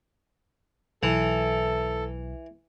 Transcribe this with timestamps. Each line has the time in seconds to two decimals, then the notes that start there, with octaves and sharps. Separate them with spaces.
1.03 B1 E3 A4